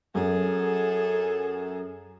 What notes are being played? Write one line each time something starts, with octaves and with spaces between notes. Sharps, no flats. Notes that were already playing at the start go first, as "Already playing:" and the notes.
F#2 G#4 A4